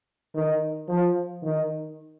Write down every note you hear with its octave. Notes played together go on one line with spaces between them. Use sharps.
D#3
F3
D#3